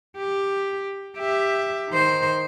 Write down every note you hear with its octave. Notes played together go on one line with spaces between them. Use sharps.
G4
G4 E5
D#3 C5